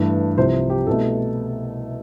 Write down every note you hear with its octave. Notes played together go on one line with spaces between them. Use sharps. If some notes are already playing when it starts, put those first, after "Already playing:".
Already playing: G2 E3 A3
C2 C3 F3 C5
G4
C2 B2 A3 A4